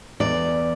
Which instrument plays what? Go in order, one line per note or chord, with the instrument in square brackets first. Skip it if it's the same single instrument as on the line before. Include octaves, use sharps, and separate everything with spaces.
[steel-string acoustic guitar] E2 D5